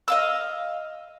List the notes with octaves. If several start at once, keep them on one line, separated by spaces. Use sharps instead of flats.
D#5 F5 E6